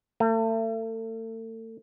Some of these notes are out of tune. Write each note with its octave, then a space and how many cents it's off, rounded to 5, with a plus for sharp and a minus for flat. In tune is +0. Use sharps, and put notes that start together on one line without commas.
A3 +35